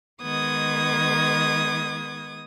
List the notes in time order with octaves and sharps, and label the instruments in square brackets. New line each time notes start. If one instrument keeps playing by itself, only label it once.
[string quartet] D#3 G#3 B3 D#6 G#6